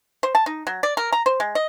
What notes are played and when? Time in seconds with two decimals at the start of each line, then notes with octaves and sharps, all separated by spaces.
0.23 C5
0.35 A5
0.46 D#4
0.67 F#3
0.83 D5
0.97 A#4
1.12 A#5
1.26 C5
1.40 G#3
1.55 D#5